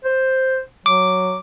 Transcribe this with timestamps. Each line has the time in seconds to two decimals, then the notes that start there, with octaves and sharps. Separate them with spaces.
0.05 C5
0.86 F#3 D6